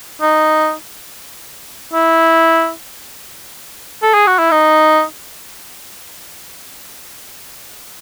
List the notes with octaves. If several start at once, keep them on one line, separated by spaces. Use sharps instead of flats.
D#4
E4
A4
G#4
F#4
E4
D#4